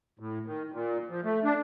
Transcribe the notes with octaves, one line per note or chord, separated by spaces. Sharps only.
A2
D#3
A#2
F3
A3
D4